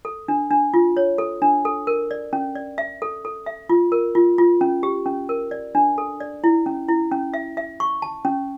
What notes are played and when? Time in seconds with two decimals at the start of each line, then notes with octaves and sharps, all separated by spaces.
0.05 A4
0.28 D4
0.51 D4
0.74 F4
0.97 C#5
1.18 A4
1.42 D4
1.65 A4
1.87 A#4
2.11 D5
2.33 C#4
2.55 D5
2.78 E5
3.02 A4
3.25 A4
3.46 E5
3.69 F4
3.92 A#4
4.15 F4
4.38 F4
4.61 C#4
4.83 G4
5.06 C#4
5.29 A#4
5.51 D5
5.75 D4
5.98 A4
6.20 D5
6.44 E4
6.66 C#4
6.89 E4
7.12 C#4
7.34 E5
7.57 E5
7.80 C#6
8.02 A5
8.25 C#4